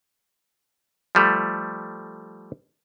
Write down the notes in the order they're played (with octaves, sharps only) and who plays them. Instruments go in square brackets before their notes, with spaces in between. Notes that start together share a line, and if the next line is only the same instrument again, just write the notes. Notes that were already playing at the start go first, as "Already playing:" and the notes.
[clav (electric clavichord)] F3 G3 A3